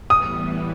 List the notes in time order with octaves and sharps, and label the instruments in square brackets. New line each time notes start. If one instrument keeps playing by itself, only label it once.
[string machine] A2 E3 G3 B3 [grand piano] D#6